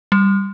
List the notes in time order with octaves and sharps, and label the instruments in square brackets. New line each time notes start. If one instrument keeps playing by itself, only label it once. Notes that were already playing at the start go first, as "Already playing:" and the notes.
[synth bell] G3